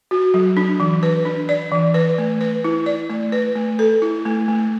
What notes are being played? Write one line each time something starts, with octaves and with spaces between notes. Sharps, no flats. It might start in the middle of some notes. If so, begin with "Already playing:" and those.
F#4
F#3
D4
E3
B4
D4
D5
E3
B4
A3
B4
E4
D5
A3
B4
A3
A4
E4
A3
A3